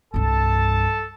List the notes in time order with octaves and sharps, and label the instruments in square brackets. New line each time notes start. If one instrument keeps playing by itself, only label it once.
[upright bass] C2 G2 [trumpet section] A4 A5